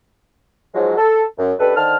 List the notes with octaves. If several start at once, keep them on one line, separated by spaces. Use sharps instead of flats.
G#2 F3 F#3 G#3
A4
F#2
C#2 D4 G4 A4 B4
D3 D#3 C5 A5 F6